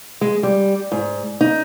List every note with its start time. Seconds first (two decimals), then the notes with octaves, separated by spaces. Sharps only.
0.21 G#3
0.43 G3
0.92 G#2
1.41 D#4